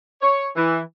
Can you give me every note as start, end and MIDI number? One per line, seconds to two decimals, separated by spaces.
0.21 0.47 73
0.56 0.80 52